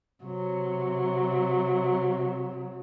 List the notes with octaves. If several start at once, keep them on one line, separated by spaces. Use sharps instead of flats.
C3 F#3